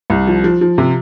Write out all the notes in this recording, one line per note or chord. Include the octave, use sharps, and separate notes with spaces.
C2
F3
F3
F3
C3